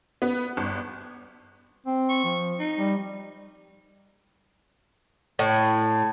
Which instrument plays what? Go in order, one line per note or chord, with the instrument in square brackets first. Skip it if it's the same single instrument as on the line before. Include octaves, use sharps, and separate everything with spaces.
[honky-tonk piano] B3
G1
[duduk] C4
[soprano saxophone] C#6
[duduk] F3
[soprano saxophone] D#4
[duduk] G3
[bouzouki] A2